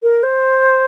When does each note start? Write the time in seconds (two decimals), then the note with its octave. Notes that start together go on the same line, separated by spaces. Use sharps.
0.03 A#4
0.23 C5